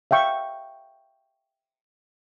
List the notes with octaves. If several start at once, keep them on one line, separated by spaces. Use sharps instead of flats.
E5 F5 G5 C#6